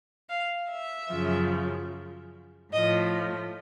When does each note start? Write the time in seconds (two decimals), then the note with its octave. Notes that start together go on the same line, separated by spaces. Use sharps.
0.30 F5
0.71 E5
1.11 F#2 C#3 F3
2.73 A2 F3 D#5